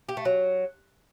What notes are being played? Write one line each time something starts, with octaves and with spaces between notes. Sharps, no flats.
G4
A3
F#3